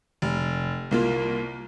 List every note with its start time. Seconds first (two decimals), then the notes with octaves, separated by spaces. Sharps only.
0.22 F1
0.91 C2 A#3 F4